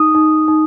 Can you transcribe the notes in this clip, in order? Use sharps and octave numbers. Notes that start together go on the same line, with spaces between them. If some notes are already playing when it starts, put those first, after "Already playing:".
Already playing: D#4 D#6
D#4
D#4